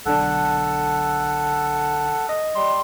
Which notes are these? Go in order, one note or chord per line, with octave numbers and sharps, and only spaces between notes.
B1 D3 D4 A4 F#5
D#5
G3 C6